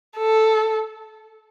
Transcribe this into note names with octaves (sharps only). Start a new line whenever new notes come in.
A4